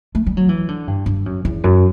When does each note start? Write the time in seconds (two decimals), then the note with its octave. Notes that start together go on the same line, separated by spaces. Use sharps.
0.15 A3
0.26 G3
0.37 F#3
0.49 E3
0.68 D3
0.87 G2
1.06 G2
1.26 F#2
1.45 E2
1.64 F#2